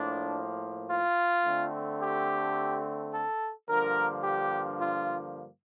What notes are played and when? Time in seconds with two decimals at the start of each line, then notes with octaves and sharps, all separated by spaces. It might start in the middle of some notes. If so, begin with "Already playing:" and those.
Already playing: A2 F3 A#3 D4
0.90 F4
1.45 D3 A3 C4
2.01 G4
3.13 A4
3.68 G2 D3 F3 A#3 A#4
4.23 G4
4.79 F4